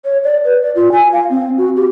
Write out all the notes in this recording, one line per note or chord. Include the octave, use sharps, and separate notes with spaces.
C#5
D5
B4
D5
F4
G#5
F5
C4
F#4
G4